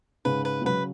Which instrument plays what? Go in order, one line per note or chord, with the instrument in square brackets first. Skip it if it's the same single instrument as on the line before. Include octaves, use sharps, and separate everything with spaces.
[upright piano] G#2 C#3 [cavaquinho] B4
[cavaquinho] B4
[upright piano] G#3
[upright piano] C#3 F#3 [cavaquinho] B4